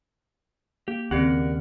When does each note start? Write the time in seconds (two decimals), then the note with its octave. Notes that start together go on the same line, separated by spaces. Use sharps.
0.88 A#3 G4
1.11 D#2 C#3 C4 G4 A#4 D5 F#5 C#7